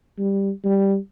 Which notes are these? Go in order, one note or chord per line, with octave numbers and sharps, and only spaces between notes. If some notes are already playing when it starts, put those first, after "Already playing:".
G3
G3